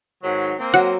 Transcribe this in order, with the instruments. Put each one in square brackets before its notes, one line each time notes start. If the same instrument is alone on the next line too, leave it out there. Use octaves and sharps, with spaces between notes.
[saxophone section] G#2 D#3 F#3
A#3 C4
[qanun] F#3 [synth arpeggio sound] F#5